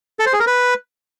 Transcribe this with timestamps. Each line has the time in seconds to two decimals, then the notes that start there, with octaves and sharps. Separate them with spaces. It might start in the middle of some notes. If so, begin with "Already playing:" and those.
0.19 A4
0.26 C5
0.33 G#4
0.40 A#4
0.47 B4